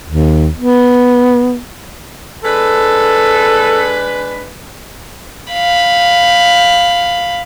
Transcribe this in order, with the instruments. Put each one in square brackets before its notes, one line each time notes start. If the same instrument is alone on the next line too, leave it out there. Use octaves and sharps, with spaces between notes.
[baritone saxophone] D#2
B3
[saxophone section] G#3 D4 B4 [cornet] A4
[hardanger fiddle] F5 B5